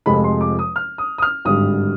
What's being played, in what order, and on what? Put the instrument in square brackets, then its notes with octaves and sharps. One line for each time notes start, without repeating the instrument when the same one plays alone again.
[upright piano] F1 F2 C3 F3 G#3 B5
C6
D6
D#6
F6
D#6
D#6
F6
G#1 G2 D3 G3 D#6